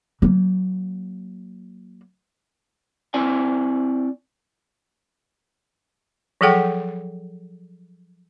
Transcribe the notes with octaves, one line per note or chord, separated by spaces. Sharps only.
F#3 A#3
C4 E4 D5 G#5
F3 F#3 G#4 A4 F#5 G5